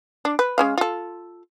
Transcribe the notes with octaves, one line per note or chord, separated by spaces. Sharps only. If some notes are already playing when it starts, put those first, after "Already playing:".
D4
B4
G#3 C#4 F5
F4 A4